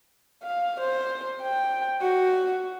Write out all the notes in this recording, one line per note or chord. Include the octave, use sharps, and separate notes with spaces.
F5
C5
G5
F#4